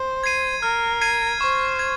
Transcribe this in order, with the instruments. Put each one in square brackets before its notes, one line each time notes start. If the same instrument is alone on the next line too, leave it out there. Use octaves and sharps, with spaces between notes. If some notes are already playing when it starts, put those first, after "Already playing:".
Already playing: [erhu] C5
[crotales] G#6 C7 D#7
[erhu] A#4 [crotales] F6
[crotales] G#6 C7 D#7
[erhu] C5 [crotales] C#6
[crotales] G#6